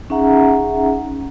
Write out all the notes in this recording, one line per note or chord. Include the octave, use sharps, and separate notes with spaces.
C#4 D#4 G#4 E5 F#5 A#5